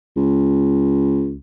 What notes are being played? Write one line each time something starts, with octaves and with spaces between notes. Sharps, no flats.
C#2